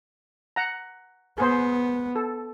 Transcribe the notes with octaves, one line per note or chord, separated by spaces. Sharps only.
F#5 A#5
B3 G#4 C5
A4